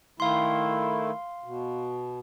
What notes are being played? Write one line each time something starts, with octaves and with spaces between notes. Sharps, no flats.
D#3 A3 E4 F5 C6
B2